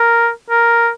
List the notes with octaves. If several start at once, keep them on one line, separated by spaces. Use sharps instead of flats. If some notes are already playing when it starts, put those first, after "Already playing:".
Already playing: A#4
A#4